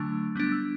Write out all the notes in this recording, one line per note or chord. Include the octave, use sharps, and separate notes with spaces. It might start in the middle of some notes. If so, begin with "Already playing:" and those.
Already playing: D3 F#3 A3 D4 E6
G3 B3 D4 F#6
E6